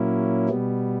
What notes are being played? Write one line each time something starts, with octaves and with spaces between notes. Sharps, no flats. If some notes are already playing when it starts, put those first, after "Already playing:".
Already playing: A#2 F#3 A#3 C#4 E4
B2 G3 B3